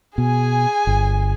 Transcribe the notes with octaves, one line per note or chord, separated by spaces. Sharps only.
B2 G#4 G#5
G1